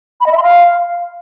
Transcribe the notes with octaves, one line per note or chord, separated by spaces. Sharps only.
B5
D#5
E5
C6
F5